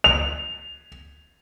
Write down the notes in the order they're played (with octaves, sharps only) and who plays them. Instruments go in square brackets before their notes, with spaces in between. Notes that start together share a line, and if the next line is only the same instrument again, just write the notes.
[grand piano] F7